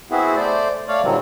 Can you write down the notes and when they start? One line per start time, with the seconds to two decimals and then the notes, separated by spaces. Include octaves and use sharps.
0.11 B3 C4 E4 F#4 G#4
0.36 A3 C5 D5
0.88 A3 C#5 D5 F5
1.03 A#2 D3 D#3 F#3 G3 C4